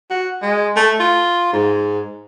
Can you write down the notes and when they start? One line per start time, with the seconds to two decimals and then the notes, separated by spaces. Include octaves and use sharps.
0.11 F#4
0.42 G#3
0.76 A3
1.00 F4
1.53 G#2